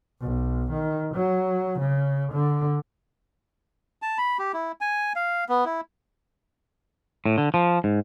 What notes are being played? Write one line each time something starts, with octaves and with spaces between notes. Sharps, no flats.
B1
D#3
F#3
C#3
D3
A5
B5
G4
E4
G#5
F5
B3
E4
A2
D3
F3
G#2